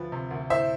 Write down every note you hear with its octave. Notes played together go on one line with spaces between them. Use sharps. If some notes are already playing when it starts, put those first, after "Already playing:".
Already playing: D2 F3 B4
C3
D2
A2 C5 E5